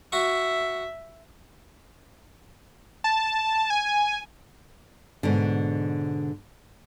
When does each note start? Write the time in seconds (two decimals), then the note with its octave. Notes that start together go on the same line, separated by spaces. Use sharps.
0.12 F#4 E5 C#6
3.04 A5
3.70 G#5
5.23 G#2 B2 D3